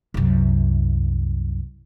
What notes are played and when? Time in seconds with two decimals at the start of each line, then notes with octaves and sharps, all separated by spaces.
0.14 C2 F#2